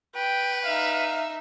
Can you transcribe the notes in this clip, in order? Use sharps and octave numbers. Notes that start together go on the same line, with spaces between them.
B4 G5
D#4 E5 F5